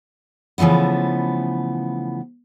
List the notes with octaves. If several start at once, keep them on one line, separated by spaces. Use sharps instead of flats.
C#3 E3 F3 A3 B3